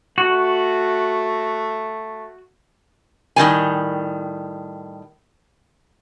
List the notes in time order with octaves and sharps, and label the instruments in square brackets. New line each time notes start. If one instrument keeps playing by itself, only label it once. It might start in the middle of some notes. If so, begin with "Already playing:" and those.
[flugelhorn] A3 [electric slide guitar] F#4
[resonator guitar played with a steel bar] A2 D#3 G3 G#5